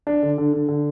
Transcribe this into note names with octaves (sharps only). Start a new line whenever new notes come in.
D4
D3
D3
D3
D3